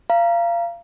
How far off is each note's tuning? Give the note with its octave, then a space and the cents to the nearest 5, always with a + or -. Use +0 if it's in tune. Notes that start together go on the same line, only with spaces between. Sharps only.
F5 -25 A#5 +5